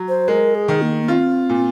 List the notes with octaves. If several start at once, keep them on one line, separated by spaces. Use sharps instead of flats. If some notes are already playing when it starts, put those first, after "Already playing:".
Already playing: F#3
C5
G#3 A#4
G#4
D#3
A#3
A#3
C4 F4
A#2